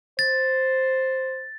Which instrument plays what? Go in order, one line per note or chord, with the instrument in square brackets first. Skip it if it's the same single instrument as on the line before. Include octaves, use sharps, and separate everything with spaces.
[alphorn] C5 [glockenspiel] A6